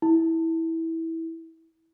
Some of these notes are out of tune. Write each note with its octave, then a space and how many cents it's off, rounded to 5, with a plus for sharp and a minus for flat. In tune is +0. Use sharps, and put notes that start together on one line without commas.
E4 -15